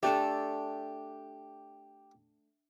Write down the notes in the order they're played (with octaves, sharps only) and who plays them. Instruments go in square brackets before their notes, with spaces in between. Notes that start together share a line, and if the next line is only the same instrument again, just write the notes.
[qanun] A3 D4 A4 [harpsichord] G4